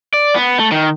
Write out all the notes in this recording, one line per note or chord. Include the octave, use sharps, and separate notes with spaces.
D5
B3
A3
D#3